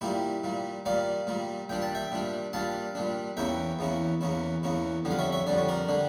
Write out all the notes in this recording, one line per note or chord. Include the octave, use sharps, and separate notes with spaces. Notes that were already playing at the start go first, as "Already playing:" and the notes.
A#2 G3 A#3 E4 G4
A#2 G3 A#3
A#2 G3 A#3 D5 F5
A#2 G3 A#3
A#2 G3 D4 G5
A5
E5 G5
A#2 G3 D4
A#2 G3 D4 F5 A5
A#2 G3 D4
E2 E3 A#3 C#4 E4 E5 G5
E2 E3 A#3 C#4 E4
E2 E3 A#3 C#4 E4
E2 E3 A#3 C#4 E4
F2 D3 G3 D4
F5
C#5 E5
C#5 E5
F2 D3 G3 D4 D5
C#5
A#4 D5
D3 G3 D4